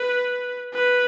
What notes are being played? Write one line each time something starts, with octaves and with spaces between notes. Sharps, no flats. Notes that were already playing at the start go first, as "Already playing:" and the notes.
Already playing: B4
B4